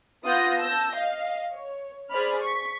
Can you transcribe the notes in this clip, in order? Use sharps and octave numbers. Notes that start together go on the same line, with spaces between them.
B3 F4 F#5 D#6 G6 A#6
A5 E6 G6 A#6
D#5 F5
C#5
G#4 C5 D5 B5 F6
C#6 B6